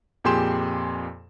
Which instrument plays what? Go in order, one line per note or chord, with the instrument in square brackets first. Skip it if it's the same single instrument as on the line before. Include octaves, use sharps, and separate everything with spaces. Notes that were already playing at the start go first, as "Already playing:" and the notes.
[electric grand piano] F2 A#2 G4 G#4 C6 E7